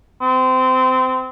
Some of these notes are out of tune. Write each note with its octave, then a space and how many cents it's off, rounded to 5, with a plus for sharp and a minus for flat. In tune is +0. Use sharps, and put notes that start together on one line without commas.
C4 -25